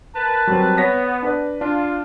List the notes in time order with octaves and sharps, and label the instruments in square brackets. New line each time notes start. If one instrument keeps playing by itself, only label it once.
[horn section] A#4 B4 A5
[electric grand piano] F#3 G3 C4
[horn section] B3 [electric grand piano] C#5 A#6 B6
[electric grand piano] D4 B4 D5
[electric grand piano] D4 [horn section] F4